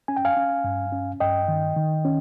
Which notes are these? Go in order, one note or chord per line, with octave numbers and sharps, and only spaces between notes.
C#4 G#5
G5
F5 G#5
C#4
G2
C#4
G2 D#5 G5
D#3
D#3
C#4